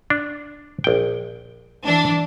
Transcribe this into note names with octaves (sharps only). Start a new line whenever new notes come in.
D4
A#1 G5
E3 D4